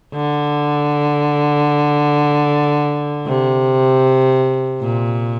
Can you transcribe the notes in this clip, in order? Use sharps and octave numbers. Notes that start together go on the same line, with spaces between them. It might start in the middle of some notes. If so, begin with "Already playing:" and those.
D3
C3
A#2